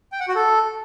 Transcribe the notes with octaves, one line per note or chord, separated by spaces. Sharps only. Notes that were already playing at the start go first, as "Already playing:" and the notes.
G5
F#5
F#4
A4